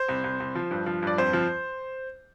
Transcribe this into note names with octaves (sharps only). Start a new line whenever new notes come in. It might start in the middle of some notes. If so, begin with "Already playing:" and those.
Already playing: C5
C2
C2
C2
F3
G2
F3
G2 D5
F2 C5
F3